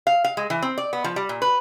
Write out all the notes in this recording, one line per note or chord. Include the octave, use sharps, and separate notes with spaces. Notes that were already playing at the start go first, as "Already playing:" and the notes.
F5
F5
G#3
E3
C4
D5
B3
F3
G3
A#2
B4